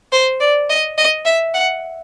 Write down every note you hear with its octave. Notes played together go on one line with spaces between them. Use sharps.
C5
D5
D#5
D#5
E5
F#5